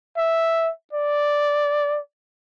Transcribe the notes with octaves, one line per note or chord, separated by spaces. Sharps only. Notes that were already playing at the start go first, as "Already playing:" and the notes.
E5
D5